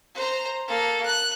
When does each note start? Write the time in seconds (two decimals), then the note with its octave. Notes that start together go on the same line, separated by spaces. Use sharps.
0.15 C5 A#5
0.68 A#3 A4
1.05 F#6